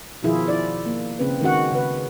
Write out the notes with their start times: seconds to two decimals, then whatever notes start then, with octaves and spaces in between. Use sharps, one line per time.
0.23 B2 D#3 F3 E4 F4 G#4
0.48 E4 D5
0.86 A#3
1.19 C#3 C4 B4
1.41 D#3 G#3 C#4 F#4 F#5
1.72 C#3 B4